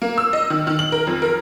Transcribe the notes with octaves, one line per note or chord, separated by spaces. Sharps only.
A#3
E6
D#5
D#3
D#3
F#7
A#4
F2
A#4